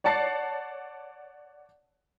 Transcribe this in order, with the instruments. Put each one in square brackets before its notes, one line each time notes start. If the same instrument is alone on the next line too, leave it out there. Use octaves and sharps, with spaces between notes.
[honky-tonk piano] C#5 D5 F#5 A5 A6 C7